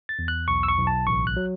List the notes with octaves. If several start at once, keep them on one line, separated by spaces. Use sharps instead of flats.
A6
E2
F#6
B1 C#6
E6
C#6
B1
A5
A1 C#6
F#6
F#3